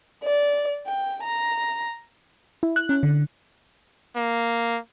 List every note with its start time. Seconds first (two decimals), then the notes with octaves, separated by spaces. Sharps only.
0.23 D5
0.87 G5
1.23 A#5
2.63 E4
2.76 F#6
2.89 C#4
3.03 D3
4.16 A#3